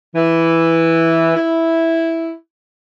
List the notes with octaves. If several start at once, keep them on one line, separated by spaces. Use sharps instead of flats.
E3
E4